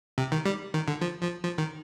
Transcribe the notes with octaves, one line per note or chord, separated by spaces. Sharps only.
C3
D#3
G3
D#3
D3
F3
F3
F3
D#3